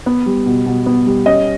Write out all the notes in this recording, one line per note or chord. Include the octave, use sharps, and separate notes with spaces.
B3
G3
B2
B2
B3
G3
C#4 D#5